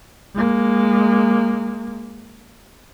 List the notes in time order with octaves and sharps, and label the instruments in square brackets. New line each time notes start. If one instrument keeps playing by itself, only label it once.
[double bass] G#3 A#3